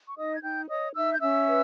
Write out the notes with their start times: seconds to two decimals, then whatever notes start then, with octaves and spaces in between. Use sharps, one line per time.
0.08 C#6
0.17 D#4 D#5 D#6
0.36 G#6
0.43 D#4 G5 G6
0.69 C#5 D#5 D#6
0.95 D#4 E5 E6
1.14 G6
1.21 C#4 E5 E6
1.47 B4